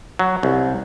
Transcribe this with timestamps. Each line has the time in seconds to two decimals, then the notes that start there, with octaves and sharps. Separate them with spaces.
0.19 F#3
0.43 C2